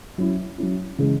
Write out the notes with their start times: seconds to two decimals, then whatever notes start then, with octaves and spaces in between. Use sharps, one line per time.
0.18 F#3 C#4 E4
0.58 F#3 C#4 E4
0.98 C#3 E3 G#3